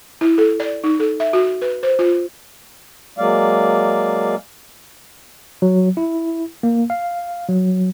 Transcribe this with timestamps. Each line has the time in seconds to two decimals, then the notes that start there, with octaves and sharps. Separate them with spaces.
0.21 E4
0.38 A4
0.60 D5
0.84 D#4
1.00 A4
1.20 E5
1.33 F#4
1.62 B4
1.83 C5
1.99 F4
3.18 F#3 G#3 A#3 D5 F5
5.62 F#3
5.97 E4
6.63 A#3
6.90 F5
7.49 F#3